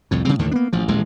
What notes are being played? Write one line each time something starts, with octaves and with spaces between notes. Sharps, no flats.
C2 F2 A2
C#3 G3 C4
D#2 A2 D3 D#3
A#3 B3 D4
A1 F3
D#1 A1 G#3